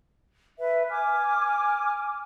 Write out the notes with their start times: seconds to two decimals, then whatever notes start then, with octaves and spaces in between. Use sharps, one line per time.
0.58 B4 E5
0.90 G#5 D6 F6